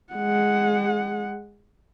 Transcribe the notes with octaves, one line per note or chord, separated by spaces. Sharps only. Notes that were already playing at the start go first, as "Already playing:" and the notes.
G#3 F#5